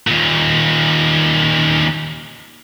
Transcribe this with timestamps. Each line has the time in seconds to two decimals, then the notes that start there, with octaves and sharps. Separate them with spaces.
0.07 D#2 A#2